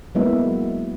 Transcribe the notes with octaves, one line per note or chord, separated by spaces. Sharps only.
F#3 G#3 A#3 B3 E4 E5